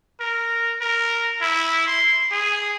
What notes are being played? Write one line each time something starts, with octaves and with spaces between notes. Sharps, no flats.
A#4
A#4
E4
C6
G#4